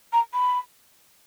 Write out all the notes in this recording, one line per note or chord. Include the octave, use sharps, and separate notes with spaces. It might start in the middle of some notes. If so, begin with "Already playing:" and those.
A#5
B5